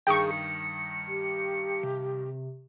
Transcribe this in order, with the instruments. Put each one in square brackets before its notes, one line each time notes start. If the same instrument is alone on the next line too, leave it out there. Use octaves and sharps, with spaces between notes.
[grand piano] G2 D#3 D#6 [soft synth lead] G#4 [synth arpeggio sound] G5 C#6
[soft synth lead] C#7
[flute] G4
[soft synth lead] C3